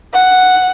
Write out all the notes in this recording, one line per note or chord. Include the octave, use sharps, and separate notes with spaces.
F#5